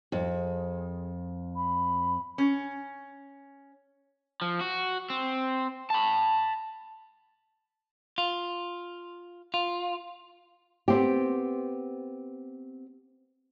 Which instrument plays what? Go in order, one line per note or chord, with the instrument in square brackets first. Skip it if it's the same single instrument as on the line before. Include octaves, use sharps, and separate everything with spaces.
[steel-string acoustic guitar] F2
[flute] G#4
B5
[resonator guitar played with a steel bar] C#4
[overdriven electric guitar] F3
F#4
C4
A5 B5
[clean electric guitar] F4
F4
[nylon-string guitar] B3 C4 G4